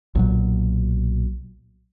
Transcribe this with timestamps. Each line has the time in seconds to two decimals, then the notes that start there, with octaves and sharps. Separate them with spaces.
0.15 B1 A#2 F#3